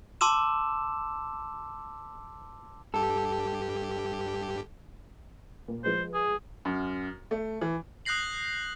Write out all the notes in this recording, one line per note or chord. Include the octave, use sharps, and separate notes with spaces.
A5 C6 D6 E6 E7
G2 G4 A4
A#2
F3 G#3 B4 C5
G#4
F#2
A3
E3
D#6 F#6 G6 A#6 C7 F#7